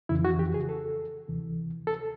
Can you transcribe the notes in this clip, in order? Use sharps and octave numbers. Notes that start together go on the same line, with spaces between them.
F2 C#3 E3 E4
F#4
G4
G#4
A4
D2 C3 E3
A4